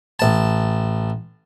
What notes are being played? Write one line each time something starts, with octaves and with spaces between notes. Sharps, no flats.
A1 A5